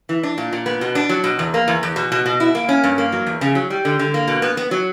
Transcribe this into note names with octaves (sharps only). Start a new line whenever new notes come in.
E3
D4
A#2
A#2
B3
B2
D4
F#3
B2
E2
A#3
E2
E2
B2
B2
B2
E4
A#3
C#4
G2
A#3
F#3
E2
C#3
F#3
G3
D3
D3
A#3
B2
B3
B3
F#3